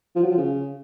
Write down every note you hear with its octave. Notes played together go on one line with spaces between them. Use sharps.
F3
F#3
F3
C#3